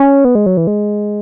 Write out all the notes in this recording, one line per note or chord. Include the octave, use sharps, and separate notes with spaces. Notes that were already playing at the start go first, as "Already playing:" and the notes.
Already playing: C#4
B3
G#3
F#3
E3
G#3